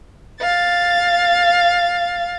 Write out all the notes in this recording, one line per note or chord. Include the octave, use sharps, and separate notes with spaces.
F5 A6